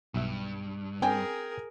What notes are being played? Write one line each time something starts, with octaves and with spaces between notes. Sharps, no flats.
B1 G2 E5
C4 D4 G#4 A#4 G5 G#5